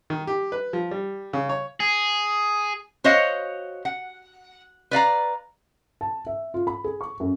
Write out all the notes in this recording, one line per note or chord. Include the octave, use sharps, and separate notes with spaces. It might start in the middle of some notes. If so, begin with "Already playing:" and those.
D#3
G4
B4
F3
G3
C#3
C#5
G#4
F#4 C5 C#5 D#5 F5
F#5
B4 D5 F5 A#5
A5
E5
F4
B5
G#4
C#6
F#2